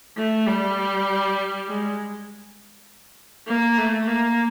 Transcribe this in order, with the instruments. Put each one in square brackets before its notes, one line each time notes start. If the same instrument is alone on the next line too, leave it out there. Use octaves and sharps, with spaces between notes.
[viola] A3
G3
G#3
A#3
A3
A#3